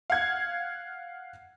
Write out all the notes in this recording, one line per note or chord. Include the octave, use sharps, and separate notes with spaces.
F5 F#5 G#6